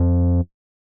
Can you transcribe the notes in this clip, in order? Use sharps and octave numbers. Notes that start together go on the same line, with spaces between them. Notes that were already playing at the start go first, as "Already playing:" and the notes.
Already playing: F2